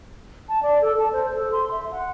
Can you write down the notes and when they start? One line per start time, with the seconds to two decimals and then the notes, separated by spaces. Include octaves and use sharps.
0.49 A5
0.63 D5
0.82 A4
0.99 A5
1.12 C5
1.32 A4
1.52 C6
1.71 E5
1.91 F#5